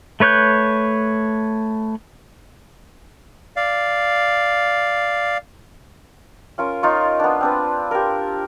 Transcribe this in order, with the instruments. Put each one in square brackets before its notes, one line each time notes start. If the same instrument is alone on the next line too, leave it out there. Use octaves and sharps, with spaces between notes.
[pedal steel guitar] A3 B4 C#5 F#6 G6
[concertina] D5 F5
[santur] C#4 F4 A#4 F5
D#4 F4 C#6
B3 D4
C4 D4 B4
G4 A#4